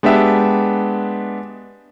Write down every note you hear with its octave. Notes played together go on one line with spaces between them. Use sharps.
G#3 B3 D4 G4 E5